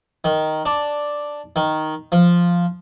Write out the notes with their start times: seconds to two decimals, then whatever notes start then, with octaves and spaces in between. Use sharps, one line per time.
0.24 D#3
0.66 D4
1.56 D#3
2.12 F3